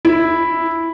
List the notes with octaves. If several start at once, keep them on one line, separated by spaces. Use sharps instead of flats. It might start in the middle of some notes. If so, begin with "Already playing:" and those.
E4